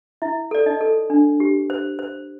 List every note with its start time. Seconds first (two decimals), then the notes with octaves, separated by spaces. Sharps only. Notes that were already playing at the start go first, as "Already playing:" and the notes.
0.22 E4 E5
0.51 A4 D5
0.66 D#4 D#5
0.81 A4
1.10 D4
1.40 G4
1.70 C5
1.99 C5